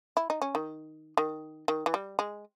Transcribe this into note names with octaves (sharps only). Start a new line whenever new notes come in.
E4
D#4
C#4
D#3
D#3
D#3
E3
G3
G#3